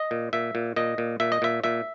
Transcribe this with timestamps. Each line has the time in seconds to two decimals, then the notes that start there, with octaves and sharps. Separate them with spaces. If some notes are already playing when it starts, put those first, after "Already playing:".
Already playing: D#5
0.11 A#2
0.33 A#2 E5
0.55 A#2
0.76 A#2 D#5
0.98 A#2
1.20 A#2 E5
1.32 D#5
1.42 A#2 E5
1.64 A#2 E5